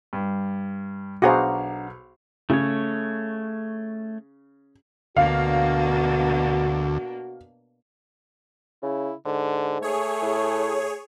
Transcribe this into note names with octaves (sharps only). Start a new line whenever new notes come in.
G2
B1 D4 F#4 G#4 C5 F5 F#5 A#5
C#3 A3 C#5
D2 B2 A#3 D4 F#4 F5
C#3 E4
G#2 D3
A3 G#4 C#5
A2